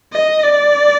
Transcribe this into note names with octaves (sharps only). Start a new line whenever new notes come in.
D#5
D5